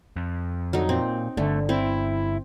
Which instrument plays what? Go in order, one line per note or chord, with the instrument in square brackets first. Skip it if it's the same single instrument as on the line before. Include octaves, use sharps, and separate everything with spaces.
[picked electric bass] F2
[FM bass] D3 [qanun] F#3 D#4
[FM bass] A#2 [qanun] C4
[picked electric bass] G1 [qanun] D3 [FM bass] A3
[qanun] C4 [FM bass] E4